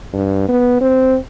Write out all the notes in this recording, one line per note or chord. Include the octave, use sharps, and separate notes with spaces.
G2
B3
C4